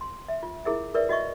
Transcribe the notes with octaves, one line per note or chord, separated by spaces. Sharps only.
C6
E5
F4
E4 G#4 A#4 E5
A#4 B4 D5 E5
F#4 D#5 E5 C#6